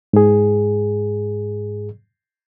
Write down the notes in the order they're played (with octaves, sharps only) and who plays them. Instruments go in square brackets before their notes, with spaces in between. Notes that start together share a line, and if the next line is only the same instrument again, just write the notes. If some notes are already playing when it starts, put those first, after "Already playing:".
[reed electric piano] G#2 G#4